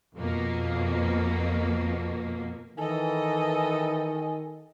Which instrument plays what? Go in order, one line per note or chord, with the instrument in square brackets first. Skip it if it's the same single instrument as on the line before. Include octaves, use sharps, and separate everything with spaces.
[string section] F2 B2 A#3
[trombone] D#3 [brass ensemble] E3 [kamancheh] A4 D#5 [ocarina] G#5